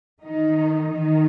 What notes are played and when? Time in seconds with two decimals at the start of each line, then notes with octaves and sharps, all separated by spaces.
0.22 D#3 D#4
0.90 D#3 D#4